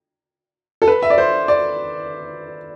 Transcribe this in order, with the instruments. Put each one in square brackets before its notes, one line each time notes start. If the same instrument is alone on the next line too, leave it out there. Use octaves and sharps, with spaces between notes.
[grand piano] A4
B4
E5
D5
C5
D5